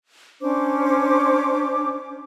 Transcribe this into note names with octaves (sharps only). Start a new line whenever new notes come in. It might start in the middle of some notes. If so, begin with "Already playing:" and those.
C#4 D4 C5 D6